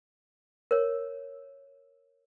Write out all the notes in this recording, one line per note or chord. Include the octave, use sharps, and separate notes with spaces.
A#4 C#5